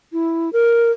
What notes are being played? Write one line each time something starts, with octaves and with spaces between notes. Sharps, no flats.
E4
A#4